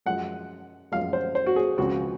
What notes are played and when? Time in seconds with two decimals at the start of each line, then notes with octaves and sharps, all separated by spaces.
0.06 F#2 F3 G#3 F#5
0.92 F#2 F3 G#3 F5
1.13 C5
1.35 C5
1.46 F#4
1.56 G#4
1.78 C#2 C#3 F3 C4 F#4